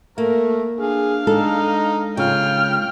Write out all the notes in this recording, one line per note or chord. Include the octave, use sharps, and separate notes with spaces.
A3 A#3 A#4
D4 G#4 F5
G#3 D#4 A4
C#3 F4 G5 F6